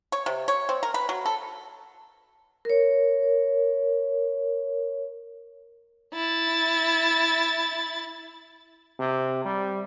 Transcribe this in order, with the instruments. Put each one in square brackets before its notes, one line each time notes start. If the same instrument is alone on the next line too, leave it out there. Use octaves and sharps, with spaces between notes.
[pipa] C#5
C3
C#5
C4
A#4
B4
F#3
A4
[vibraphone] A#4 C#5
[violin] E4 A6
[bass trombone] C3
G3